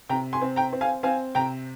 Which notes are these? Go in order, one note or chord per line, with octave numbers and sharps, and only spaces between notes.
C3 G5 A#5
G#5 C6
C4
G5 A#5
C4
F5 G#5
C4 F5 G#5
C3 G5 A#5